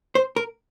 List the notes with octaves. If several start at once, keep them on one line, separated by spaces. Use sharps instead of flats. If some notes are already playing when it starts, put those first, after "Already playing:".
C5
A#4